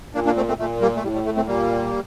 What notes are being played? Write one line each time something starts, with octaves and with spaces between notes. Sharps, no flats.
A#2 A#3 D4
A#3 D4
A3 C4
A3 C4
A#2 A3
G3 A#3
A3
A2 G3
G3
A3
A3 C4
A#2 G3 A#3